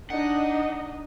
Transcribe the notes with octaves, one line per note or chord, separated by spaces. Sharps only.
D4 D#4 D#5 F#5